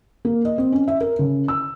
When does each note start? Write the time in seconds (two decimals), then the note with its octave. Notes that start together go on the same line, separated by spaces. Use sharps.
0.25 A#3
0.45 D#5
0.58 C4
0.72 C#4
0.88 E5
1.01 A#4
1.19 C#3
1.48 E6